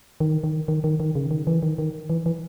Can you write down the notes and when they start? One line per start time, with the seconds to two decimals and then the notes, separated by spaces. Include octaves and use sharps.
0.20 D#3
0.44 D#3
0.68 D#3
0.84 D#3
1.00 D#3
1.15 C#3
1.31 D#3
1.47 E3
1.63 D#3
1.78 D#3
2.10 E3
2.26 E3